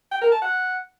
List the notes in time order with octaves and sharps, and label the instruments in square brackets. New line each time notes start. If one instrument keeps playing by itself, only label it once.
[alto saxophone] G5
A#4
A5
F#5